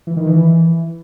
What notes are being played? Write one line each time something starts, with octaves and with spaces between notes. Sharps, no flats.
E3
D#3
E3